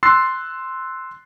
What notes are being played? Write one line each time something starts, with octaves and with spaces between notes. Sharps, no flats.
C6 E6 F#6 A6 C7